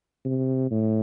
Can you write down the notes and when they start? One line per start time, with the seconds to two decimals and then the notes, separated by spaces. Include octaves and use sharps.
0.25 C3
0.71 A2